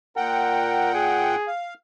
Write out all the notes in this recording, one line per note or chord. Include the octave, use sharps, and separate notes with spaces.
A#2 A#4 F#5 G5
G#4
F5